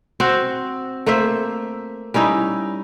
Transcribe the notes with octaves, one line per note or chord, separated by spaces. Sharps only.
C4 F#4 C5
A3 A#3 C5 E5
G3 C#4 D#4 E4